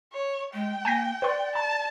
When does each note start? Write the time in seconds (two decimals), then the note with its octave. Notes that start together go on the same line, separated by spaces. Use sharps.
0.13 C#5
0.54 G#3 G5
0.85 A#3 G#5 G6 A#6
1.22 B4 D5 C6
1.55 A5 A#5